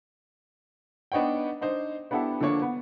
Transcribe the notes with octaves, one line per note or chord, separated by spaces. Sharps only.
B3 D4 D#4 C#5 F#5 G5
D4 D#4 C5
B3 D4 E4 G4 A4
D3 F3 A#3 D4 C#5
B3